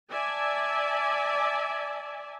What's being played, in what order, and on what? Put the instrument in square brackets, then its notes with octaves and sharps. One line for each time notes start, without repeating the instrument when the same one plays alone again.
[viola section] D5 E5 G#5 A5